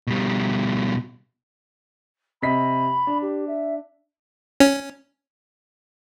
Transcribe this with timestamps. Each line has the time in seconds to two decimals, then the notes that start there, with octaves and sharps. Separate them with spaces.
0.07 B2 G3
2.42 C3 D#5 B5 B6
3.07 D4
3.22 G4
3.47 E5
4.60 C#4